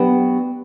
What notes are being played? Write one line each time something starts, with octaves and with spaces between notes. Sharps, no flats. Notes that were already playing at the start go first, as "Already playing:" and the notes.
Already playing: F#3 B3 D4 G4 B4